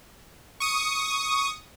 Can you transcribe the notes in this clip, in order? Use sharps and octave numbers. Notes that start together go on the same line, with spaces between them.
C#6 D#6